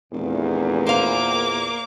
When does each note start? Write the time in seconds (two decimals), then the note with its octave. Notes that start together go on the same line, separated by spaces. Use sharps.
0.13 F1 E2 A#2
0.87 A#3 C5 F5 D6